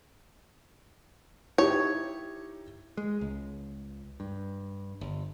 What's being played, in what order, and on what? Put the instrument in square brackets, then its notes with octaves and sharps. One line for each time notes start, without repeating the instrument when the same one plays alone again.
[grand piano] D#4 E4 G4 [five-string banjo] C#5
[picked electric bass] G#3
C#2
G2
G1